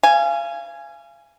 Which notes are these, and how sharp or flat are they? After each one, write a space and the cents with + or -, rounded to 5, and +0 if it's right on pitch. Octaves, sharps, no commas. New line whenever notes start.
F5 -30 G#5 +0